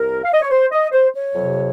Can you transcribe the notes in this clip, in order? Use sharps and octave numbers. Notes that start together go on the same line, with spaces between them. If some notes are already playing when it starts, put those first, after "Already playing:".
Already playing: C2 A#4
F5
D#5
C#5
C5
D#5
C5
C#5
F2 C3 F#3